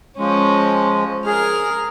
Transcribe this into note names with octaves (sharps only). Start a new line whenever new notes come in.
F3 G#3 C#4
G#4 A#4 F6